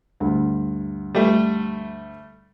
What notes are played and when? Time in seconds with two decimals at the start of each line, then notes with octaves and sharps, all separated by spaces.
0.20 D2 G2
1.15 G3 A3